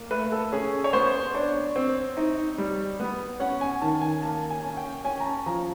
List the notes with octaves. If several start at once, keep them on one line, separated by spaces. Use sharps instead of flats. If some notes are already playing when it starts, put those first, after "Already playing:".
Already playing: A#3
A3 B4
A4
C#4 G#4
C#5
B3 C5
D4 C#5
C4
D#4
G3
B3
C#4 F#5
G#5
D#3 A5
G#5
A#3 A5
G#5
C#4
G5
C#4 G#5
A#5
A5
F3 A#5